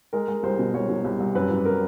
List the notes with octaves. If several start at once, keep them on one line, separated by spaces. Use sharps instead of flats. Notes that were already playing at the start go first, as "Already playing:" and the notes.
G#3 A#4
G#3
C2 C5
B2
C2 C#5
B2
C2
C2
F#2 B4
F#2
A#4